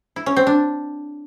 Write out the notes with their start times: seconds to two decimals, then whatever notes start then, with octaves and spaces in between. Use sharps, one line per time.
0.16 E4
0.26 C#4
0.37 C4
0.47 D4